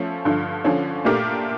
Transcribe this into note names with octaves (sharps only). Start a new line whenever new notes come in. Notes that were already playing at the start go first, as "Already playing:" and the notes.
Already playing: F3 A3 C#4
G2 D3 F3
D3 F3 C#4
A#2 A3 D4 G4 A#4